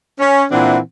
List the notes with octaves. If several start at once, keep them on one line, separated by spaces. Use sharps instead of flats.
C#4
A#2 E3 C4 D4 E4 F#5